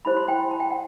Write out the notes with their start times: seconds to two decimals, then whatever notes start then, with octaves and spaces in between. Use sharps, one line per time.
0.05 E4 G4 C5 B5
0.17 C6
0.27 G5 B5
0.51 A5
0.60 G5
0.71 F#5